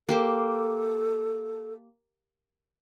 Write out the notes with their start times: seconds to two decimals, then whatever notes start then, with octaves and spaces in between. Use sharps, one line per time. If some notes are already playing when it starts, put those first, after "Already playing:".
0.09 A#3 G4 A4 C5